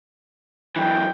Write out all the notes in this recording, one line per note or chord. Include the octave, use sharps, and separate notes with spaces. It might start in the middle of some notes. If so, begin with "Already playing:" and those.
F#2 E3 G5